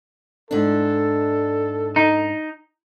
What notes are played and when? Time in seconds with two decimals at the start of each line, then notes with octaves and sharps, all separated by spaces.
0.51 G#2 D4 A4
1.96 D#4